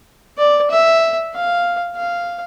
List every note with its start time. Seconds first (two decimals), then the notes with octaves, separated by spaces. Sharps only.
0.38 D5
0.71 E5
1.34 F5
1.96 F5